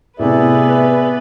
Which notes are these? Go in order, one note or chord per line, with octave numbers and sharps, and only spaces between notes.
A2 C3 B3 G#4 B4 D5 E5